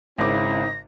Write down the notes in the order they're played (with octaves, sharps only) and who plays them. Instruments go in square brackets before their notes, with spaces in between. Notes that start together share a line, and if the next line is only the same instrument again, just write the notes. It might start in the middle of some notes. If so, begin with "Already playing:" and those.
[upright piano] G#1 C#3 D6 [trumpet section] C4 D#4 E4 [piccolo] A#6